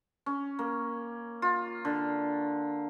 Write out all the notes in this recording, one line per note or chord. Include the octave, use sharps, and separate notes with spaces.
C#4
A#3
F4
D3